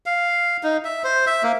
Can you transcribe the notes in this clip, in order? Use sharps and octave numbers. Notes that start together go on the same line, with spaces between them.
F5
D#4
E5
C5
E5
A#3